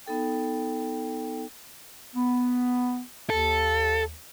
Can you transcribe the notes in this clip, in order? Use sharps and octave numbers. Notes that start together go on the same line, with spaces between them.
B3 D#4 A4 G5
B3
D#2 A4